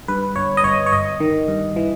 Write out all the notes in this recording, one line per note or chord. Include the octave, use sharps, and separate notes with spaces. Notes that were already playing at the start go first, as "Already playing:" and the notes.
G2 B4
G1 C#5
D#5
G1 C#5
C#5
G1 D#5
D#3
G2
E3